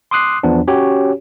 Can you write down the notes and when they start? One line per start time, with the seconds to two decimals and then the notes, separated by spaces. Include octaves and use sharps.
0.11 C6 D6 D#6 F#6 C7
0.43 E2 F3 B3 D4
0.68 C#4 F#4 G4 C#5